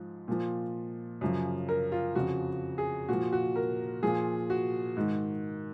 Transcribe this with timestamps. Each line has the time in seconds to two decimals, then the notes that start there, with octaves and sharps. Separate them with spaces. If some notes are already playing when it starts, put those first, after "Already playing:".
Already playing: G#2 F3
0.28 A#2 F3
1.21 F#2 C#3 F3
1.69 A#4
1.92 F4
2.15 F2 C#3 F3 F#4
2.78 G#4
3.09 A#2 F3 F#4
3.32 F#4
3.56 A#4
4.03 A#2 F3 G#4
4.50 F#4
4.97 G#2 D#3